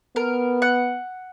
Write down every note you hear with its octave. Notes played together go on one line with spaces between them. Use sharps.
B3 A#4
F#5